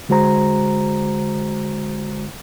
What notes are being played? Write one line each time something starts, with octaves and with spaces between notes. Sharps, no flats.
D3 G#3 F#4 C5 A#5